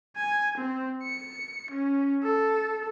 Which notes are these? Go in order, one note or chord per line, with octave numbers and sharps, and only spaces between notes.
G#5
C4
C#7
C#4
A4